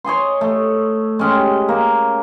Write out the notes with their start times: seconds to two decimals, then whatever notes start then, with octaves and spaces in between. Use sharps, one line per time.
0.04 C#5 D#5 G#5 C6
0.41 A3
1.19 G#3 C#4 G4
1.69 A#3